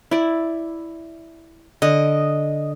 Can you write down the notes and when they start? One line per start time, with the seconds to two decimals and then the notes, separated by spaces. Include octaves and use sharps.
0.11 E4 D5
1.82 D3 D#5